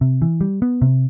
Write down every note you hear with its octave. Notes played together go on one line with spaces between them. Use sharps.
C3
E3
G3
B3
C3